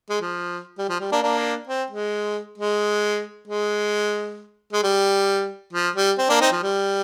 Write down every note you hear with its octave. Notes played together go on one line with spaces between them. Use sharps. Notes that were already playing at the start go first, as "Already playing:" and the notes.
G#3
F3
G3
F3
G3
A#3 D4
A#3 D4
C4
G#3
G#3
G#3
G#3
G3
F3
G3
C4
A#3 D4
C4 D#4
F3
G3